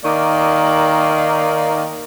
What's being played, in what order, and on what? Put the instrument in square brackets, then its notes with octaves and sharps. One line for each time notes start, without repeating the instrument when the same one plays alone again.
[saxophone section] D#3 A#3 D5